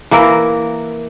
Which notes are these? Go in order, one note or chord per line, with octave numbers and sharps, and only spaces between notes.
E3 A#3 E4 A#4